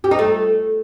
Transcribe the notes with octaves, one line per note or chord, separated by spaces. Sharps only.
G4
D#4
A3